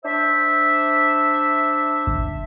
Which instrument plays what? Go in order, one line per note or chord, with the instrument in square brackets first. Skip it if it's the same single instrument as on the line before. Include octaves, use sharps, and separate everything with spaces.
[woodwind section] D4 C5 E5
[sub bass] G1